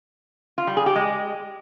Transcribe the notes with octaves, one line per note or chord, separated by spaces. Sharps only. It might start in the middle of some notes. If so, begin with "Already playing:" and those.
F4
G3
G#4
G4
G#3